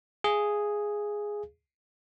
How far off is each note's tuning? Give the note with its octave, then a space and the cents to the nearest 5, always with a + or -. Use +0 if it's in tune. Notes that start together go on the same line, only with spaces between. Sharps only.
G#4 +0 F5 -35